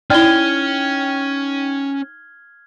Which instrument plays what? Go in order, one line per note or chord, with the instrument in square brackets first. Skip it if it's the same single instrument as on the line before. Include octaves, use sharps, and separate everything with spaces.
[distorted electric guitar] C#4 [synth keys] D#4 G5 [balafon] E4 D5 [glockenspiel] F6 G#6 G7